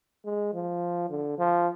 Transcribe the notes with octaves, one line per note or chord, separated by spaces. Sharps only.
G#3
F3
D3
F3